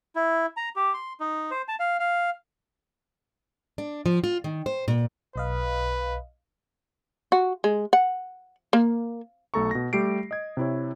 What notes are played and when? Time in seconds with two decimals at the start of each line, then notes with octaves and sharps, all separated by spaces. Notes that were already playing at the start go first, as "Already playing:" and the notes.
0.16 E4
0.57 A#5
0.76 G4
0.94 C6
1.20 D#4
1.51 C5
1.68 A5
1.80 F5
2.00 F5
3.78 D4
4.06 F3
4.24 F4
4.44 D#3
4.66 C5
4.88 A#2
5.36 B1 B4 D#5 F5
7.32 F#4
7.64 G#3
7.93 F#5
8.73 A#3
9.54 B1 A3 A4 A#5 C#6
9.71 B2 A#6
9.93 G3 A3 G4 C7 D7
10.31 D#5 G#6
10.57 C3 E4 C#5